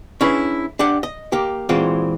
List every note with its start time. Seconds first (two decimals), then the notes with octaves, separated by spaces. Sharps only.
0.21 C#4 D4 E4 G#4 B4
0.79 D4 G4 D5 F#5
1.03 D#5
1.32 A#3 G4
1.69 A#2 E3 G#3 C4 F4 F#4